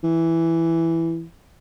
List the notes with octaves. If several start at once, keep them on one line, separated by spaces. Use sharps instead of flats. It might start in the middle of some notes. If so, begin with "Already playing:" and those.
E3